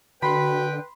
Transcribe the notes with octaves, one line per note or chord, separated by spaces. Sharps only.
D3 F#4 B4 G5 B5 C6